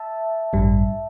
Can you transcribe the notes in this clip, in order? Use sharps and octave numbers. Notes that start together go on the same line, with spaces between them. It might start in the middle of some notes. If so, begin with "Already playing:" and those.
Already playing: E5 A5
A1 G2 G3